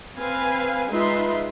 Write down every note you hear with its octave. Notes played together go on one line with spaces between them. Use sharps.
C4 B4 F5 G#5
G#3 D#4 F4 B4 E5 C6